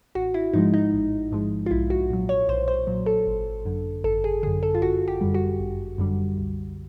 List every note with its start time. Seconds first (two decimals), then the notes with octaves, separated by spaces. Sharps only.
0.15 A1 F#4
0.34 E4
0.53 G#2 F3 G#3 D#4
0.74 D#4
0.93 A1
1.32 G#2 F3 G#3
1.66 F4
1.71 B1 E4
1.90 F#4
2.10 A#2 F#3
2.29 C#5
2.48 B1 C5
2.68 C5
2.87 A#2 F#3
3.06 A4
3.27 G#1
3.65 F#2 D3
4.04 G#1 A4
4.24 G#4
4.43 D3 G#4
4.47 F#2
4.63 A4
4.75 F4
4.82 G1 F#4
5.08 G4
5.21 F#2 D3 G3
5.34 F#4
5.59 G1
5.98 F#2 D3 G3
6.37 C2